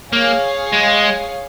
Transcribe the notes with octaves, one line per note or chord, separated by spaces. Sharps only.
A#3 G#4 C#5 F5
G#3